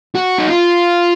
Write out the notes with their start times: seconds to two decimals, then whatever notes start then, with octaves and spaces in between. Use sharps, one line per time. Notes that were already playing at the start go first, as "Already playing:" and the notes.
0.15 F#4
0.39 D#4
0.49 F4